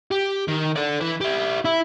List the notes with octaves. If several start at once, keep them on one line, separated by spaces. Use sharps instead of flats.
G4
D#3
A4 D5
E3 B4
E4 G4
E4